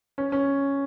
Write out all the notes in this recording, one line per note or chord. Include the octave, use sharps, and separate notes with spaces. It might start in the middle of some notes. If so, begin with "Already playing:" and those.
C#4
C#4